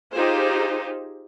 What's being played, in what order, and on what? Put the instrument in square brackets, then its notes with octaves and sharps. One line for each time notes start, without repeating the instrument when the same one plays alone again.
[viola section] D#4 F4 G4 G#4 C5